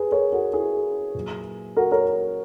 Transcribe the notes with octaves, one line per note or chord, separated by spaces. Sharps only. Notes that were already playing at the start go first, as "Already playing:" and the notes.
Already playing: G#4 B4
A#4 C#5
F#4 A#4
E4 G#4
A#2 F#3
F#4 A#4
A#4 C#5